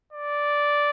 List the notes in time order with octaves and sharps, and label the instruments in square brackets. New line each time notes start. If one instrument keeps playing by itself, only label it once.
[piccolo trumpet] D5